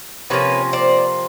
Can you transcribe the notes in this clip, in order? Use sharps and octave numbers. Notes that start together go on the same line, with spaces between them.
C3 F3 A#3 C#4 B4 C#5
C5 D5